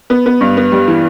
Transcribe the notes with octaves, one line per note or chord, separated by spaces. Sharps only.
B3
B3
G2
B3
G3
E3